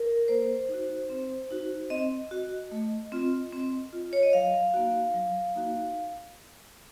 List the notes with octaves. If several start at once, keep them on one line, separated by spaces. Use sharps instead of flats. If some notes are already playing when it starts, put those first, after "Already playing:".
Already playing: A#4
A#3 C5
D#4
F#4
C4
D#4 F#4
C4 D#5
F#4
A3
C4 F4
C4
F4
C#5
D#5
F#3 F5
A#3 D#4 F#4
F#3
A#3 D#4 F#4